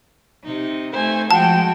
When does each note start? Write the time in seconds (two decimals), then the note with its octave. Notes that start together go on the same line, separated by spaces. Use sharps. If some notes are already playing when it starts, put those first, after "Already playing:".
0.44 C3 D#4
0.92 A3 D#4 C5 G#5
1.31 F3 G#3 F#4 G5 A5